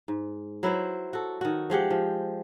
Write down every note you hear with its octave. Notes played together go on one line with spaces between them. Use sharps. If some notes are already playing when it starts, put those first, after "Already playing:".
G#2
F#3 E4 B4 C5
F#4 A4
D#3 F#4
F3 G#3 G4 F#5
F3